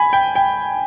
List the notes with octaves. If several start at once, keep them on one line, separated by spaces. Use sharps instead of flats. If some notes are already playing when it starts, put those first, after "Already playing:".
Already playing: G#5 B5
G5
G5